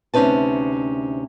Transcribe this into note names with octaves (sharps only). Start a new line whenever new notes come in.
D2 C3 C#4 D#4 B4 A5